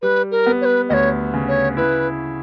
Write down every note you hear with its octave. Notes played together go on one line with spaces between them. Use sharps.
G3 B4
A#4
B3
C#5
B4
D2 C#5 D#5
C#3
C#5
E4 B4